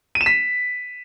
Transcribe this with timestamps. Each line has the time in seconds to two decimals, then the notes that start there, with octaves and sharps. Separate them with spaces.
0.15 D#7
0.21 E7
0.26 B6